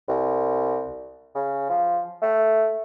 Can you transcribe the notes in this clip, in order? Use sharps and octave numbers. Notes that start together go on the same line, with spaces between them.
C2
C#3
F3
A3